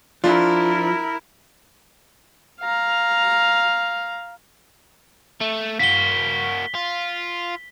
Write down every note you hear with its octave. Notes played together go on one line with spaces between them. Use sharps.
F3 D4 E4 F4 A#4
F5 A#5
A3
A#3 F#4 B6 G7
F4